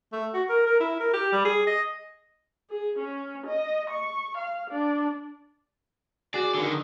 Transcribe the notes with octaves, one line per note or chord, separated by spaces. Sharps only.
A3
F#4
A#4
A#4
E4
A#4
G4
G3
G#4
D#5
G#4
C#4
D#5
C#6
F5
D4
F#4 G#4 D5
D3 D#3